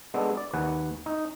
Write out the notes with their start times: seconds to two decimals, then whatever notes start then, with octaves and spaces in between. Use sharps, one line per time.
0.14 G#3 B3 D4 A4
0.37 D5
0.54 D#2 B4 F#5 G#5
1.06 D#4